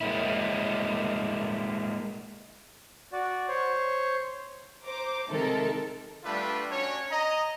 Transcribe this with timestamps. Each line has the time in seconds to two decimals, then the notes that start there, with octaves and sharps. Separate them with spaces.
0.01 G#3 A#3 E4
3.12 F#4 D5
3.48 C5 C#5
4.84 C5 A#5 D6
5.29 C3 D#3 G#3 A3 A4 A#4
6.24 G3 A3 B3 D4 F4 B4
6.71 C#4 D4 F#4 C#5
7.10 D#5 A#5